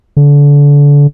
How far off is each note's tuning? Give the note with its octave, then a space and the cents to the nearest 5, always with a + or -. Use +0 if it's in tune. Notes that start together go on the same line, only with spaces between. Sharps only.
D3 -30